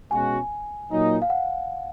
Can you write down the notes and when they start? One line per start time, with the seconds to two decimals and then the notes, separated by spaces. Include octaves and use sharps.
0.11 B2 G#3 C#4 F#4 G#5
0.90 A#2 F#3 A#3 D#4
1.22 F5
1.30 F#5